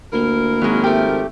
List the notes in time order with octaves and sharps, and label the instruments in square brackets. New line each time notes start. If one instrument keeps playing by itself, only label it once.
[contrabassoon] D2 [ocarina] A#3 [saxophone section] E4 F4 A#4
[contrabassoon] G#1 [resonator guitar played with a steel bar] F#3 G#3
[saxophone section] F3 B3 A#4 [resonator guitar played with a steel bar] A3 G4